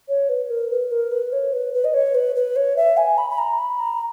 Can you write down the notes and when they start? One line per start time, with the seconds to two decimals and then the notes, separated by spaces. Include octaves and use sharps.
0.09 C#5
0.29 B4
0.50 A#4
0.71 B4
0.92 A#4
1.12 B4
1.33 C#5
1.53 B4
1.74 B4
1.84 D#5
1.94 C#5
2.15 B4
2.36 B4
2.56 C#5
2.77 E5
2.97 G#5
3.18 B5
3.30 B5
3.38 A#5
3.59 B5
3.80 A#5